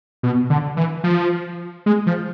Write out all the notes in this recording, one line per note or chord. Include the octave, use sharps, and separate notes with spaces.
B2
D3
E3
F3
G#3
F3